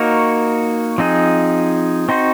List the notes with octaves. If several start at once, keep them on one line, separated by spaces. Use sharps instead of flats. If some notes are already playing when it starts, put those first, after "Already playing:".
Already playing: A#3 D#4 F#4 A#4 C#5
F3 C4 D#4 G#4
C4 D#4 F#4 C5